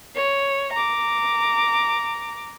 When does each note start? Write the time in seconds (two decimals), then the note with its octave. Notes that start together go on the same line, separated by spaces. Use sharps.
0.15 C#5
0.73 A#5 D6